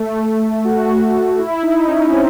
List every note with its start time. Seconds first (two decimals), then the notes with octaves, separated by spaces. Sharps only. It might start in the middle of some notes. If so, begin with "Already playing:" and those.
Already playing: A3
0.65 F#4
1.39 E4
1.63 D#4
1.87 C#4
2.12 C4